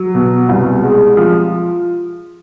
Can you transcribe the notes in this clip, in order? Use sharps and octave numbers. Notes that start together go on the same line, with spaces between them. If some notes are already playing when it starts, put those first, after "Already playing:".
Already playing: F#3
B2
C2
G#3
F3